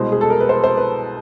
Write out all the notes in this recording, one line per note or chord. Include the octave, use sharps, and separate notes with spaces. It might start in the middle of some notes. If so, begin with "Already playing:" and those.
Already playing: C2 B2 G#3 C5
G#4
A4
A#4
B4
C5
C5
B4